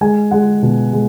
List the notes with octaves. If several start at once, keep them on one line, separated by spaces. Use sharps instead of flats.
G#3 G#5
G#3 F#5
B2
G#3